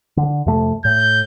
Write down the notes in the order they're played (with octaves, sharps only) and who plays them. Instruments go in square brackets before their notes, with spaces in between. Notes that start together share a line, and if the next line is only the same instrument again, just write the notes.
[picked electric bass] D3
F2 C3 A3
[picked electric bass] A2 [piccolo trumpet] G6